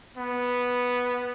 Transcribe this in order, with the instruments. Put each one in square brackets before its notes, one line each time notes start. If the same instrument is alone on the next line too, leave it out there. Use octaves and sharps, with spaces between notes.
[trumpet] B3